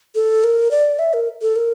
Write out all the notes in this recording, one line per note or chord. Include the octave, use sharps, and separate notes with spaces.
A4
A#4
D5
E5
A#4
A4
A#4